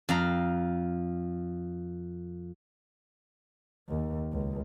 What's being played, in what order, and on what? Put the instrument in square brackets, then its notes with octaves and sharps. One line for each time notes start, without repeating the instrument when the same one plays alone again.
[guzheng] F2 F5 A#5
[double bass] D#2
C#2